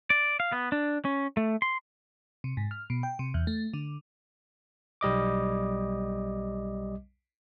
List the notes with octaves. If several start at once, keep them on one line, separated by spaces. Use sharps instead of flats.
D5
F5
B3
D4
C#4
A3
C6
C3
G#2
F6
B2
G5
C3
E2
A3
D3
B1 G3 D#5 D6